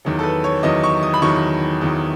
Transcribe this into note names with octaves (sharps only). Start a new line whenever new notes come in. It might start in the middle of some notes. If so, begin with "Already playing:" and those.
E2 D#3 F#3
A4
B4
C#5
E2 D#3 F#3 D#5
C#6
D#6
B5
E2 D#3 F#3 C#6
E2 D#3 F#3